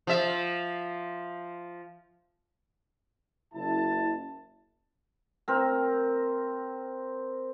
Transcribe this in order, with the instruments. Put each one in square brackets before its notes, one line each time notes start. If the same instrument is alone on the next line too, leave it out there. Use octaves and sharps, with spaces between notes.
[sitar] F3 E5
[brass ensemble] F#1 E4 A5
[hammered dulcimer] C4 A#4